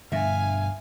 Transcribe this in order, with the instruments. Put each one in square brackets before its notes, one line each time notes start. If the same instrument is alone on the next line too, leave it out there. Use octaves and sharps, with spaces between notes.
[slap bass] G2 B2 D3 [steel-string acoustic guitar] E5 [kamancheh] F5 G#5